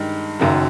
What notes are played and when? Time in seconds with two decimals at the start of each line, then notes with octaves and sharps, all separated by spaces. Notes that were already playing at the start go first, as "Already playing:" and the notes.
Already playing: G2 D#3 G#3
0.39 F#1 F#2 D#3 F#3